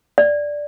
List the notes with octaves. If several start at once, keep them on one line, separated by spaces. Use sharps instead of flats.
D5